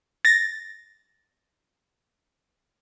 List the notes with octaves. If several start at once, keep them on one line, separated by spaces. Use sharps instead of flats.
A6 A#6